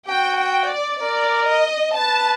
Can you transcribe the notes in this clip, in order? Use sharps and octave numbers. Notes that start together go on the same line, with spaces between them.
F#4 G5
G5
D5
A#4 D5
D#5
B4 A5